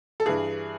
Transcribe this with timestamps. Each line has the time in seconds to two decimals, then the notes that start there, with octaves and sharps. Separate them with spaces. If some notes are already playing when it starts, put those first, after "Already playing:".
0.20 A4
0.26 G2 E3 G#4